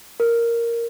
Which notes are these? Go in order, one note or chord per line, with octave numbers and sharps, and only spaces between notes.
A#4